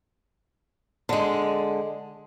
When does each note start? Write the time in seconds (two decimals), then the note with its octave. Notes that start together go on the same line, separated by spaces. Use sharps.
1.09 D3 G#3